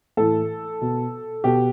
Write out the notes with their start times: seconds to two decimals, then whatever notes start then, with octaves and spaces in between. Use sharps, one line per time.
0.17 A2 E3 A4
0.81 B2
1.44 B2 G4